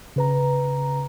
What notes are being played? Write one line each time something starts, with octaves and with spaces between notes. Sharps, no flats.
C#3 B4 A#5